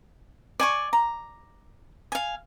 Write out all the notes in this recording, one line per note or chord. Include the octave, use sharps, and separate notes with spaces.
D5 G#5 C#6
A#5
F5 G#5